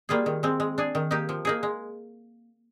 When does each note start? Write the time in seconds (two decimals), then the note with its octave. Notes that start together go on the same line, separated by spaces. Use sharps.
0.09 G3 A#3 F4 G#4
0.26 D#3
0.43 G#3 C4
0.60 G#3
0.78 D4 G#4
0.95 D#3
1.11 A#3 D#4 G4
1.29 F3
1.45 A#3 D#4 G#4
1.63 G#3